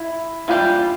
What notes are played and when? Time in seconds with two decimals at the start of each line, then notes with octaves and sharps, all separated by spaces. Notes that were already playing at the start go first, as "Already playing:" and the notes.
Already playing: E4
0.48 E3 G3 A#3 D4 F4 G4